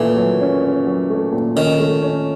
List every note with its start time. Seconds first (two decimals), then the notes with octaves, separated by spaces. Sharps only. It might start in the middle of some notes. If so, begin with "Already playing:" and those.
Already playing: A#2 E3 A3
0.16 F#3
0.41 C#4
0.64 C#4
0.86 F#3
1.10 A3
1.33 A#2
1.56 D#3 C#4
1.80 A3
2.02 C#4